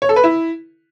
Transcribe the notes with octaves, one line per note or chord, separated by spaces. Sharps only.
C#5
A4
B4
E4